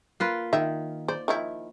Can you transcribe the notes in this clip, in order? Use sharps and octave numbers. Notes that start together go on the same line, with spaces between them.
A#3 F4 B4
D#3 E5
C5 D5
D#3 F3 E4